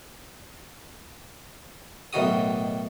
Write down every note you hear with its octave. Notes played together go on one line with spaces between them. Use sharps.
B1 A2 D#3 F#4 D#6